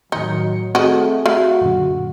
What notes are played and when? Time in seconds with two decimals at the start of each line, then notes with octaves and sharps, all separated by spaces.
0.12 A2 D#3 F#3 D#4 C#7
0.75 A3 C4 F#4 G#4 D#5
1.26 A3 F#4 F5
1.61 F#2 A#2 D3